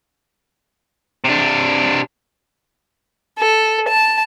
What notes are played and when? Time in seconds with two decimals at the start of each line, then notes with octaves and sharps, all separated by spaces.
1.24 C3 D4
3.38 A4
3.89 A5